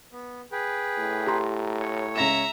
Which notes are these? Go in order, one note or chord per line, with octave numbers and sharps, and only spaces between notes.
B3
G#4 B4 G5
A2
G4 A#5 C6
C#5
C#2 E5 A#5 A#6 E7